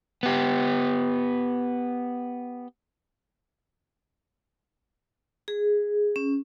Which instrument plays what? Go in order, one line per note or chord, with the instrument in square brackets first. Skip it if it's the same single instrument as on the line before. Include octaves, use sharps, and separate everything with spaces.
[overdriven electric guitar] B3 G4
[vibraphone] G#4
C#4